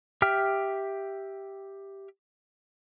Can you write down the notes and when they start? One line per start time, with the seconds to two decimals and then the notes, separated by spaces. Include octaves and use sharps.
0.22 G4 E5 G5 F6